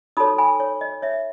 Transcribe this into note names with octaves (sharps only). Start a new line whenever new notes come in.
D#4 F#4 A4 C#5 B5 D#6
G#5 B5
C#5
D#5
C#5 E5